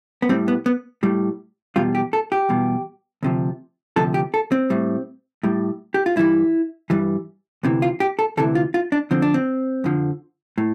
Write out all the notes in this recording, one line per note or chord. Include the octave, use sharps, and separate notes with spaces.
B3
A2 G3 C4
B3
B3
A2 G3
E2 B2 G3 F4
G4
A4
G4
E2 B2 G3
D2 C3 F3
D2 C3 F3 A4
G4
A4
C4
A2 G3
A2 G3
G4
F4
G2 E3 G3 E4
G2 E3 G3
D2 C3 E3
F4
G4
A4
D2 C3 E3 A4
F4
F4
D4
F2 D3 F3 C4
D4
C4
F2 D3 F3
A2